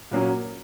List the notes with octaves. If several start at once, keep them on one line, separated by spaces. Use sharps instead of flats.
A#2 F#3 A#3 C#4